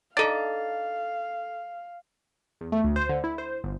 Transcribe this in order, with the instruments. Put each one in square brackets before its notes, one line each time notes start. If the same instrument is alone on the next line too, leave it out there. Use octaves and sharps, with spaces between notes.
[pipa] D4 D#4 [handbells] A4 A6 [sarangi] F5
[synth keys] E2
A3
D2
C5
D3
E4
C5
G1